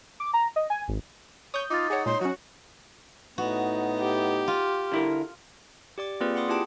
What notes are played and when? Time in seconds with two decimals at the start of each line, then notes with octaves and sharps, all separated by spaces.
0.20 D6
0.33 A#5
0.56 D#5
0.70 G#5
0.88 G#1
1.54 C#5 D#6 G6
1.70 D#4 F4 D6 A6
1.90 G#4 C#5 F#5
2.06 A#2 G#3 C#5 C6
2.21 F#3 C#4 F#4
3.38 A2 B3 D#4 F#4
4.00 G4
4.48 F4
4.92 D3 E4 A#4
5.98 G4 D5 D6
6.20 A#3 C4 F4 G#4 B4 D5
6.35 F#5 B5 C6 D6 D#6
6.48 E4 F4 G4 G#4 G5 A5